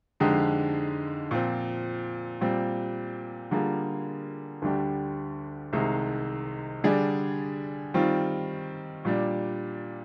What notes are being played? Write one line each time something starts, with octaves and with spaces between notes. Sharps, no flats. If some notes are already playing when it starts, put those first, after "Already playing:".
F2 D3 G#3 D#4 G4
A#2 F3 C4
A#2 G3 C4
D3 G3 A#3 F4 G#4
D2 D3 G3 D4 G4
C2 C3 D#3 G#3 D#4
D3 G3 D4 G#4
D#3 G3 C4 F4
A#2 G3 D4